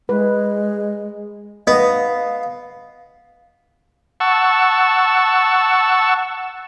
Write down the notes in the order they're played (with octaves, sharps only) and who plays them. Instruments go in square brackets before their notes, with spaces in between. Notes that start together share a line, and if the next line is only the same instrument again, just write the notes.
[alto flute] G#3 [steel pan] B4
[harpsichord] B3 [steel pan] D#5 [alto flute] F5
[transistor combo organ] F#5 A5 C#6 E6